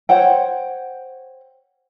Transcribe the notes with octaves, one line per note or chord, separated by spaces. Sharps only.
C5 C#5 F#5 G5